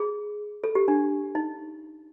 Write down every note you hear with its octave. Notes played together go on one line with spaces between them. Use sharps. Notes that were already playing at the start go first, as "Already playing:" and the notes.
Already playing: G#4
A4
G4
D4
D#4